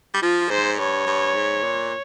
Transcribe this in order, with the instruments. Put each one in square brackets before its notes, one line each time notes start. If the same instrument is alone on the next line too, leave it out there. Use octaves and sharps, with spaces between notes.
[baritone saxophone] G3
[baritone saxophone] F3 [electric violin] F4
[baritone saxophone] G#2 [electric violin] C5
[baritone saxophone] G2 [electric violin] C#5
[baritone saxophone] G2
G#2
A#2